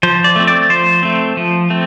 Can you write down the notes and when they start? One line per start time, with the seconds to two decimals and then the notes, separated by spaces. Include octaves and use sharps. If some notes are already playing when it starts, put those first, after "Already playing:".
0.03 F3 C5
0.24 D5
0.36 A3 C4
0.47 D5
0.70 F3 C5
1.03 A3 C4
1.37 F3
1.70 A3 C4